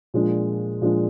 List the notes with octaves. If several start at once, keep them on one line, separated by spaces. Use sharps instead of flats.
A#2 F3 G#3 D4
A#2 F3 G#3 D4